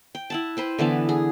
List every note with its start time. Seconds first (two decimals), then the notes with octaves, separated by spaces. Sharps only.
0.15 G5
0.30 E4 F#5 A5
0.57 B4 C5 G5
0.78 D3 E3 B3 A5
1.09 G#4